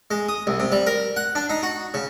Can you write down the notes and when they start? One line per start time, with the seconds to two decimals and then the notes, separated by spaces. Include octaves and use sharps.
0.11 G#3
0.29 D#6
0.47 C2
0.60 C3
0.72 G3
0.86 A#4
1.16 F#5
1.35 D4
1.50 D#4
1.63 F#4
1.94 C#3